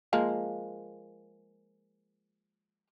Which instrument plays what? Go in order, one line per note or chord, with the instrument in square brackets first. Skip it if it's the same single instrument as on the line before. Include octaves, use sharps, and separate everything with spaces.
[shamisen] F3 G#3 A#3